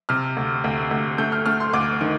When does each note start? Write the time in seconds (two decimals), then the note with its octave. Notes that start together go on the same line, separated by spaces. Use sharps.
0.09 C3 F6
0.37 D2
0.64 D2
0.91 D2
1.18 A3 G6
1.32 F6
1.46 A3 F6
1.60 C6
1.73 D2 D6
2.01 D#3